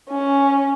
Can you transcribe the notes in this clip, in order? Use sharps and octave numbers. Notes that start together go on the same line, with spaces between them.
C#4